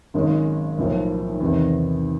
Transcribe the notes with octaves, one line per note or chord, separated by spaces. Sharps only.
G#1 F#2 D#3 G#3 C#4
B1 A2 F3 A#3
E2 C3 D#3